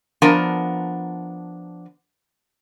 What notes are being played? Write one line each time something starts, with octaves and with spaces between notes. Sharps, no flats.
F3 B3 D4 A#4 A#5